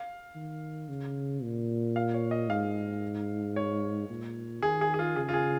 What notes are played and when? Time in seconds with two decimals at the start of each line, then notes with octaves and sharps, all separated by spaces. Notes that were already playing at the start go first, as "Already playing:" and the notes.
Already playing: F5
0.35 D#3
0.89 C#3
1.43 A#2
1.96 F5
2.14 C#5
2.31 D#5
2.50 G#2 F5
3.56 C#5
4.09 A#2
4.62 D#3 G#4
4.81 G#4
4.94 G#4
4.99 F4
5.16 C#3 G#4
5.29 F4
5.34 G#4